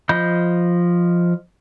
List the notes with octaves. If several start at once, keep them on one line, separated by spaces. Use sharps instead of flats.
F3 D#5 B5 G6